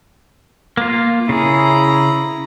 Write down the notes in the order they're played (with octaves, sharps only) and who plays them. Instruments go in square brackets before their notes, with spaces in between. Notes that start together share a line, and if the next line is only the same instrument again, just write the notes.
[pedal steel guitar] A#3 F4
[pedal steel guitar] C#3 G#4 [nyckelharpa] E4 A#5